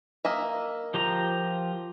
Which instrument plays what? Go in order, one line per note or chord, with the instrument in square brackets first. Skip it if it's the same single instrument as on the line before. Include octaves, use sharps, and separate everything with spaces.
[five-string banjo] A#3 D#5 E5
[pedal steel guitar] F3 G4 A#5